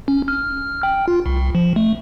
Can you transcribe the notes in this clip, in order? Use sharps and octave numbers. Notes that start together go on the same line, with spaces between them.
C#4
F6
G5
F4
C2
F3
A3